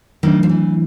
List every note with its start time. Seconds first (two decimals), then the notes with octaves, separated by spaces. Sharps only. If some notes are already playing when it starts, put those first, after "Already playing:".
0.23 D#3 F#3 A3 D4
0.43 F3
0.49 E3